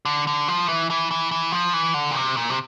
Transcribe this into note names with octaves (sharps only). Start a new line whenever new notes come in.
D3
D3
F3
E3
E3
E3
E3
F3
E3
D3
A#2
C3
A#2
C3